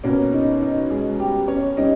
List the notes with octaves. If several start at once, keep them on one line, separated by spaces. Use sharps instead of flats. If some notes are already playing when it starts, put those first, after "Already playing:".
B2 A#3 C#4
D#4
D#4
G#3 G#4
G3 G4
C#4 C#5
G3 C#4 D#4 D#5